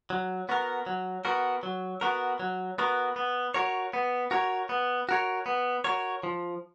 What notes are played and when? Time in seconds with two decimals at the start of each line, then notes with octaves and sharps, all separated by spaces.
0.10 F#3
0.49 B3 F#4 A#4
0.86 F#3
1.25 B3 F#4 A#4
1.63 F#3
2.01 B3 F#4 A#4
2.40 F#3
2.78 B3 F#4 A#4
3.16 B3
3.54 F#4 A#4 C#5
3.93 B3
4.31 F#4 A#4 C#5
4.69 B3
5.09 F#4 A#4 C#5
5.46 B3
5.84 F#4 A#4 C#5
6.23 F3